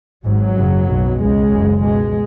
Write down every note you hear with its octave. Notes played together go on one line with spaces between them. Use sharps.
G#1 G#2 F#3
F#1 F#2 C#3
B1 B2
C#2 C#3 G#3
F#1 F#2 C#3
C#2 B2 G#3